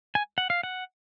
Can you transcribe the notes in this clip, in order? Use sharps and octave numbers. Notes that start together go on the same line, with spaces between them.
G#5
F#5
F5
F#5